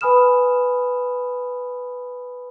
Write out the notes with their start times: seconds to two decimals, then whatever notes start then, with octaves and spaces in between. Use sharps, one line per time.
0.01 B4 G#5 B5 D#6 F6 E7